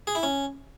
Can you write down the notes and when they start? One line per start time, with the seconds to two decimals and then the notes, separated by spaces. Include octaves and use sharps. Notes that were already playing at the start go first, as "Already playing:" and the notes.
0.07 G#4
0.15 E4
0.23 C#4